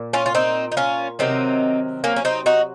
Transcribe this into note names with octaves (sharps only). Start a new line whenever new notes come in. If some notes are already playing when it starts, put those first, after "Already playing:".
Already playing: A#2
C#4 F4
F4
C4 D#4
D#4
C#4 F4
C3 D#3 F#3 C4 D#4
A#3 C#4
C#4
C4 D#4
D#4 F#4